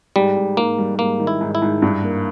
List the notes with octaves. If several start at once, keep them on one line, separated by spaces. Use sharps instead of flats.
G#2 G3
G#2
G#2 A#3
G3
G#2 A#3
D#3
E4
G#2
E4
G#2
G2
A#3